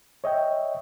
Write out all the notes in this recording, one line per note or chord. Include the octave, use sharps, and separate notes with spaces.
C#5 D#5 E5 G5